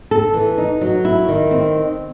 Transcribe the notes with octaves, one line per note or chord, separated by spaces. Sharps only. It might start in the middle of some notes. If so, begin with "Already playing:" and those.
A4
E3
D#4
F#3
E4
D#3
C4